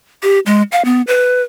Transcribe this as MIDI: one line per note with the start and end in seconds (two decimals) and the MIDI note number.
0.23 0.39 67
0.46 0.62 56
0.72 0.84 77
0.85 1.02 59
1.07 1.42 71